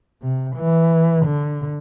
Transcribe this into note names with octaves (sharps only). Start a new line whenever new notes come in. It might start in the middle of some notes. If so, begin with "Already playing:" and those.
C3
E3
D3